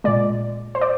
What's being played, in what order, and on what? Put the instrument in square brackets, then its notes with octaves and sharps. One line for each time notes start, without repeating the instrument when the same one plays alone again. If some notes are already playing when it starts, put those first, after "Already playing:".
[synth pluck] A#2 G#3 D5
C5
D5